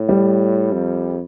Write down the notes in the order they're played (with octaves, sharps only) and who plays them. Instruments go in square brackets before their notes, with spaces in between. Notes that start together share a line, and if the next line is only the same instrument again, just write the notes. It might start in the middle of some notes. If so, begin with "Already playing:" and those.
Already playing: [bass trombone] A2
[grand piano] G3
[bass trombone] F2